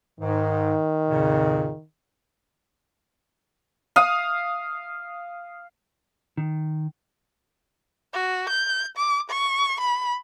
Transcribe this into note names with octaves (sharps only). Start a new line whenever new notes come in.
G#2 D#3
F2 A#2 C#3
F5 D#6
D#3
F#4
G6
D6
C#6
B5